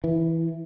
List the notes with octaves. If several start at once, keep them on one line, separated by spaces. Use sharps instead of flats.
E3